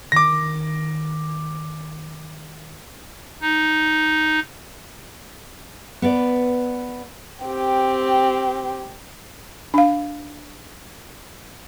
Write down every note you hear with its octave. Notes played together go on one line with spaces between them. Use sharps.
D#3 D6 A#6
D#4
B3 B4 D5
C4 G4
D4 F5